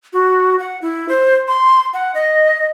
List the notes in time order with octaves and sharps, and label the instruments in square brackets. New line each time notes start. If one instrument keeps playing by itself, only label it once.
[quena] F#4
F#5
E4
C5
C6
F#5
D#5